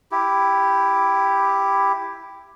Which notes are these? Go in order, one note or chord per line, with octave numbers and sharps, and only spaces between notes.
E4 G4